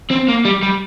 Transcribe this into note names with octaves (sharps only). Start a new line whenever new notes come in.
C4
A#3
G3
G3